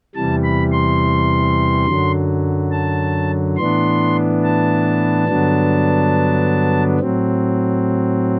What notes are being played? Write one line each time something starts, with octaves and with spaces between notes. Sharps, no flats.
E2 C3 E3 G3 A5
B5
C6
F#2 D3 F#3
A5
A2 E3 B3 D4 C6
A5
G2 D3 F#3 B3 D4
A2 F#3 C4